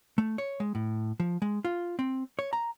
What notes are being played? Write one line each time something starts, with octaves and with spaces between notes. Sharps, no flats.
A3
C#5
G#3
A2
F3
G#3
F4
C4
C#5
A#5